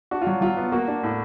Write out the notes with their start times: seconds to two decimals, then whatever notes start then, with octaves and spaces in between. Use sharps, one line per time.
0.11 D4 F#4
0.21 F4
0.27 F#3
0.41 F#3 F4
0.57 B3
0.72 A#3 F#4
0.88 D4
1.03 A2